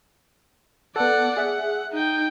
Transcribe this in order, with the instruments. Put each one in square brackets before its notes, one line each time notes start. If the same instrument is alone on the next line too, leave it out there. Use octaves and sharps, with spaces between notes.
[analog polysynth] B3 A4 [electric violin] D5 F#5
[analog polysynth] G#4 E5 [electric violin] F#5
[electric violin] D#4 G5